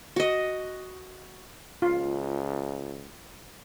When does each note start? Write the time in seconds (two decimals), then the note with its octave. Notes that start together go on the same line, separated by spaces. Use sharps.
0.16 F#4 D#5
1.82 C#2 F4